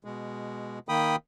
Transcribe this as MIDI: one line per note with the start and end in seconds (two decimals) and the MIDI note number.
0.05 0.79 47
0.05 0.79 56
0.89 1.16 51
0.89 1.16 58
0.89 1.16 79
0.89 1.16 83
0.89 1.16 87